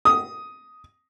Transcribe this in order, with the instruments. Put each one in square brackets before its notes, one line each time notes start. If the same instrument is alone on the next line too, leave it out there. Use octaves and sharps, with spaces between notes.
[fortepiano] D#6